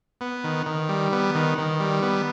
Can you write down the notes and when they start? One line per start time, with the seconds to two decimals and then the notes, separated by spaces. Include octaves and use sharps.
0.21 B3
0.44 D#3
0.66 D#3
0.89 G3
1.13 B3
1.35 D#3
1.58 D#3
1.80 G3
2.02 B3